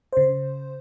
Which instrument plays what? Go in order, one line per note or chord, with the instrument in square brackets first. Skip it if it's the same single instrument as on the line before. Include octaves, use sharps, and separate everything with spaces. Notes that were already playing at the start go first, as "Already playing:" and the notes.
[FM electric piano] C#3 C5